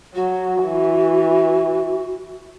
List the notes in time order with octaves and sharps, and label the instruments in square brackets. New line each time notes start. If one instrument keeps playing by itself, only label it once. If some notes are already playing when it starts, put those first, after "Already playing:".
[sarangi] F#3 [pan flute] F#4
[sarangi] E3